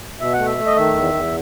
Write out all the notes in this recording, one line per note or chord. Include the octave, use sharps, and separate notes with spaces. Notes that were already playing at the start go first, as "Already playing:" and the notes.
B2 E5
F#5
A3
E5
A3
D#5
D#3 E5
E2
E2